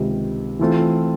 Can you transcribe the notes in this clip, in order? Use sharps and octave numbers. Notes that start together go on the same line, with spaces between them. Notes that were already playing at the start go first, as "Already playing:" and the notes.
Already playing: C#2 C3 D#3
E3 A3 C4 F4